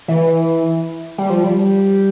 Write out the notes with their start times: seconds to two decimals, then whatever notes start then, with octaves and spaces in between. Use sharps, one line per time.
0.08 E3
1.18 G3
1.30 F3
1.44 G3